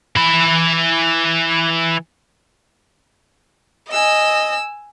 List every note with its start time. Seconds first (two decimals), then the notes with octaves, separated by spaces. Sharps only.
0.16 E3 B5
3.91 D#5 G#5 E6